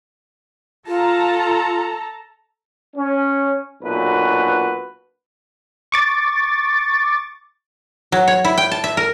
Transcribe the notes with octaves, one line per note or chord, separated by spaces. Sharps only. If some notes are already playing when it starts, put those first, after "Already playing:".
F4 A4 A5 A#5
C#4
B1 A#2 D4 F#4 B4
C#6 D6 A6
F#3
C#5
E4
G5
A5
E5
A#4